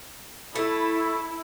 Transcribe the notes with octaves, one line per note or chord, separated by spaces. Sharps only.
A3 E4